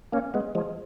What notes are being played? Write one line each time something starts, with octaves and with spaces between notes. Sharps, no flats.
A#3 C#4
G#3 B3
F3 G#3